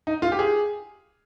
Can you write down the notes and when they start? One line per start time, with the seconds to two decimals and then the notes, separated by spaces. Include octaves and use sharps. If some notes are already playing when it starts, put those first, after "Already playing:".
0.07 D#4
0.22 F4
0.32 G4
0.39 G#4